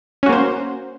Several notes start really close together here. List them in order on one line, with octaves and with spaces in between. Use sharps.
C#4 F#4 A#3 C5